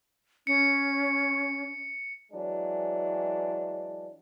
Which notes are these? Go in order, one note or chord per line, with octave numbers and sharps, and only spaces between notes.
C#4 C#7
E3 F#3 G#3 D4